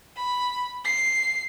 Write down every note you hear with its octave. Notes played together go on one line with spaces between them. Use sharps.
B5
C7